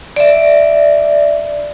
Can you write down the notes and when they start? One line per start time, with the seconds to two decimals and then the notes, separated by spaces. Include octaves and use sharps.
0.16 D5 E5